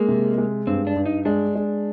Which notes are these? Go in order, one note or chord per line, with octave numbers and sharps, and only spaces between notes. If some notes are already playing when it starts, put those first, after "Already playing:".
Already playing: G#3 A#3
C3
G#3
G2 C4
D4
G2
D#4
G#3 D4
G#3